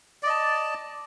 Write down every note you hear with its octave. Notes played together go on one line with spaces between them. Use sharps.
D5 D#5 A5